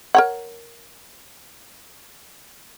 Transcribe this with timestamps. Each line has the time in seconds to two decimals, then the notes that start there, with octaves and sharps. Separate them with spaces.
0.15 A#4 C#5 F#5